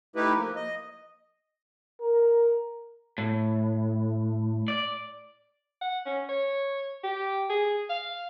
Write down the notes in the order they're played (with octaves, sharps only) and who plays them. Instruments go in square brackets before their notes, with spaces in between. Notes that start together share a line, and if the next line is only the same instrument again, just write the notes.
[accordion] A3 D#4 E4 G4 B4
F3 A#3
D#5
[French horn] A#4
[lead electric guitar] A2
D5
[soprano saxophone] F#5
C#4
C#5
G4
G#4
F5